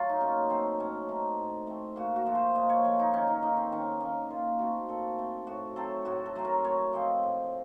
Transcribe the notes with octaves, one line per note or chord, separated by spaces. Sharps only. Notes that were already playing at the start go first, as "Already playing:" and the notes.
Already playing: F#3 A3 F4
D#4
A#2 C#4
F#3 A3 C4
A2 C#4
A3 C4 D#4
A2
A3 C4
A#2 F#4
F#4
F3 A3
C5
A#2 D#5
C#5
F3 A3
D#4
D#3 C#4
D#4
A#3 D#4
C4
D#3 C#4
A#3 C#4
A#2 F4
A3 C4 F#4
A#2 A4
A3 C4
A2 F#4
F#3 A3 C4 A4
A2 F#4
A4
F#3 A3 C4
A#4
A2 C#5
F3 C4 D#5
A2